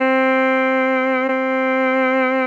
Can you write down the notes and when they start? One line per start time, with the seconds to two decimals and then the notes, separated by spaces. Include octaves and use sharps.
0.01 C4
1.29 C4